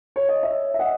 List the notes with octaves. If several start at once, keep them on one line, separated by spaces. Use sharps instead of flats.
C#5
D#5
C#5 E5
E5
D#5 F#5